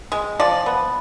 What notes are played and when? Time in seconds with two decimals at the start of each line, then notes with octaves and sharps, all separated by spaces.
0.12 G#3
0.40 F3 D5
0.66 B3